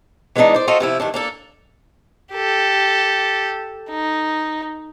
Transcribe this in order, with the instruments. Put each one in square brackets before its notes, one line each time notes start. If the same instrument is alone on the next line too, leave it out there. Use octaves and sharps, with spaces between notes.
[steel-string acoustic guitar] E3 G#3 A#3 B3 D4 D#4
C5 D5
F4 F#4 A4 C5 D#5
C3 F3 E4
G2 D#3 D4
A#3 D4 A4
[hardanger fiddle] G4 A4
D#4